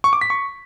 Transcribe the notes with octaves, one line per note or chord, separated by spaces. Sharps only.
C#6
D6
B6
C#6